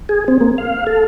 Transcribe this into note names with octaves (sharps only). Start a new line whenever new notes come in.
G#4
C4
A#3
F5
A4